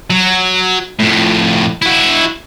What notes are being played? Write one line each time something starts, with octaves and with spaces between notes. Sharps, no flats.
F#3
F2 A2
E4 F#4